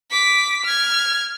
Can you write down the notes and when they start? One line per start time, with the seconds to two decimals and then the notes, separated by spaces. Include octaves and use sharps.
0.11 D6 B6
0.65 F6 G#6